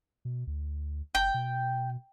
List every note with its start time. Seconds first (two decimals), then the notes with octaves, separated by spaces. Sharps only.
0.25 B2
0.47 D2
1.15 F#1 G5
1.34 B2